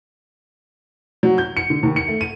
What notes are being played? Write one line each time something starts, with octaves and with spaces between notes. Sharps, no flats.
F#3
G6
C#7
D3
D#2
C#7
A3
D#7